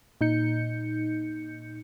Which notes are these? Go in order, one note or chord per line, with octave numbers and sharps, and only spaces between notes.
A#2 D#4 G6 C#7